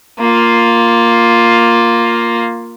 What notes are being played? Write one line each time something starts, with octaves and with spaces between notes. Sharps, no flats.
A#3 F4